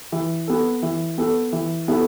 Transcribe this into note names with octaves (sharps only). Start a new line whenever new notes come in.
E3
B3 A4
E3
B3 A4
E3
B3 E4 A4